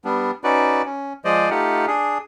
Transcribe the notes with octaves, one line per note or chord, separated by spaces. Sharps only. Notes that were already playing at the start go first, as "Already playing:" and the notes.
G3 B3 D4
C#4 D#4 F#4 B4 D5
C#4
F3 G#3 C5 D5 D#5
A3 D#4 F4 G4 F#5
D4 G#4